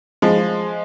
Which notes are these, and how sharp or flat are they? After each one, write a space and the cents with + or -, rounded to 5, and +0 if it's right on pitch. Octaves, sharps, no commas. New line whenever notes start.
F3 +0 G#3 +0